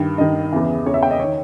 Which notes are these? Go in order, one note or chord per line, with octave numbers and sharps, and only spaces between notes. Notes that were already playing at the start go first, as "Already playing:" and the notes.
Already playing: G2 D#3
G2 D#3 D#5
E2 C#3 E3
E2 C#3 E3 C#5
E5
G5
D#5
D#3 C#5